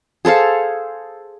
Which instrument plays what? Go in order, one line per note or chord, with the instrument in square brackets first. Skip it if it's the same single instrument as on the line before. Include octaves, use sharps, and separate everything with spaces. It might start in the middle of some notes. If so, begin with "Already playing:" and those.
[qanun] G#4 A4 C5 F5